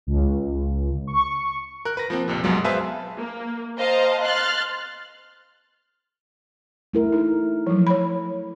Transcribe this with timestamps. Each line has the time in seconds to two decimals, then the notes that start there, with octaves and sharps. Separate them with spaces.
0.07 C#2
1.07 C#6
1.85 A#4 F#6
1.97 B4 A#6
2.10 F3 A#3 C4
2.28 A#1 F2 C3
2.44 B1 F#2 B2 F#3 G#3
2.64 G#4 B4 C5 E5 F5 A5
3.17 A#3
3.77 C5 D#5 F5 G5 A5 A#5
4.23 C6 F6 F#6 A6
6.94 A3 E4 A#4
7.12 D#4
7.67 F3 F#3
7.87 C#5 B5